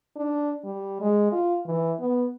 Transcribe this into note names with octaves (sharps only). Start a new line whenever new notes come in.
D4
G3
G#3
F4
E3
B3